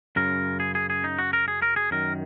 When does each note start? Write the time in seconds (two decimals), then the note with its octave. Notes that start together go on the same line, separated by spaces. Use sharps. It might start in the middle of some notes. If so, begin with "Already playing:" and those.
0.16 F#2 C#3 A#4
0.60 G#4
0.75 G#4
0.90 G#4
1.04 D#4
1.19 F#4
1.33 A#4
1.48 G#4
1.62 A#4
1.76 G#4
1.91 F#2 D#3 A#4